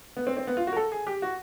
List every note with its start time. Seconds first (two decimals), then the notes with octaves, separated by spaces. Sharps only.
0.17 B3
0.27 C4
0.37 C4
0.47 B3
0.57 F4
0.67 F#4
0.73 A#4
0.76 A4
0.92 G#4
1.07 G4
1.22 F#4